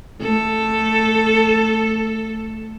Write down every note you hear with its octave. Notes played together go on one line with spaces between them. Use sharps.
A3 A4